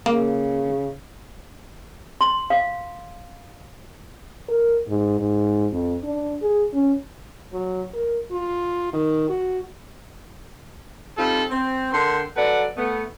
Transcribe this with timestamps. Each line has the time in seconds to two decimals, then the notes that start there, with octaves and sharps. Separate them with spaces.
0.06 C#3 A#3
2.21 C6
2.50 F5
4.49 A#4
4.88 G#2
5.20 G#2
5.72 F2
6.04 D4
6.42 G#4
6.73 C#4
7.53 F#3
7.94 A#4
8.31 F4
8.93 D#3
9.29 F#4
11.18 G3 C4 D#4 F4 A4
11.50 C4
11.92 D3 A#4 G5 C6
12.36 F#3 A4 B4 D5 F#5
12.77 A3 B3